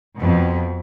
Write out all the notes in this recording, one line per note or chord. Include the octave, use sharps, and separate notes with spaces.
F2 B2